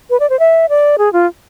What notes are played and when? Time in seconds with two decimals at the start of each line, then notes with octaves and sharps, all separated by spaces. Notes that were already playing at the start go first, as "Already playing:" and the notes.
0.10 B4
0.20 D5
0.30 C5
0.39 E5
0.69 D5
0.98 G#4
1.13 F4